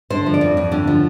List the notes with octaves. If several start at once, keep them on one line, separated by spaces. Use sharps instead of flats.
D3 C5
F3
D5
F2
F2
D3
F3